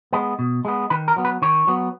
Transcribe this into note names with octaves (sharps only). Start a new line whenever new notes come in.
G#3 B3
B2
G#3 B3
D#3 B4
A#4
F#3 B3
B4
D#3 C#5
F#3 B3